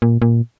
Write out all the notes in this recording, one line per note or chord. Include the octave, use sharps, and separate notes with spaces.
A#2
A#2